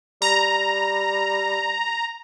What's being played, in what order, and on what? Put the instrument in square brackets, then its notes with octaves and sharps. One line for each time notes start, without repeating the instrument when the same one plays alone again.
[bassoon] G3 [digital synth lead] A#5